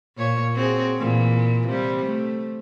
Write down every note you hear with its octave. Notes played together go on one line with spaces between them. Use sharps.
A#2 C#5
C4 F#4 G#4
A#2 E3
C3 G3
A3